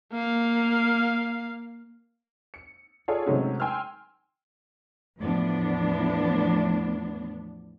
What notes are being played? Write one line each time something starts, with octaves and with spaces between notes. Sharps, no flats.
A#3 F5
C#7
F4 G#4 A4 C#5 D5 F5
C3 D#3 F#3 G#3 A3 C#4
G5 G#5 C6 E6 F6
E2 A2 F3 B3 D4